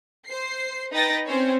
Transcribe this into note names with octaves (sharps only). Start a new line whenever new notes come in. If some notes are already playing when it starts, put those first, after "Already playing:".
C5 C7
D#4 B4 D#5 G5 A6 A#6
C4 C#4 C5 C#5